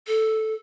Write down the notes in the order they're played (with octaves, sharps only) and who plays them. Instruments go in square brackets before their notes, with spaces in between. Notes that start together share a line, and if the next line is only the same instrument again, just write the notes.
[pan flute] A4